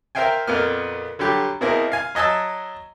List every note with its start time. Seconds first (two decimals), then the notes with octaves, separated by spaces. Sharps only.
0.15 A#4 C5 E5 F5 G5 G#5
0.47 F2 A#2 A#3 B3 B4 F6
1.19 D3 F#3 G3 G4
1.61 B2 A#3 C4 E4 G#4 A#4
1.92 F5 G#5
2.15 F#3 D#5 G#5 A5 E6